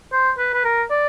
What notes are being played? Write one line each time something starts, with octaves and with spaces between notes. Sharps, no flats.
C5
B4
B4
A#4
D5